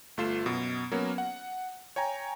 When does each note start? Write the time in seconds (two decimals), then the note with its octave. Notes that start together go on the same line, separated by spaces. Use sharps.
0.17 G1 A3 F4 C7 E7
0.46 F#2 B2
0.91 F#3 A#3 B3 C#4 F#4 A#4
1.18 F#5
1.96 C#5 G5 G#5 A#5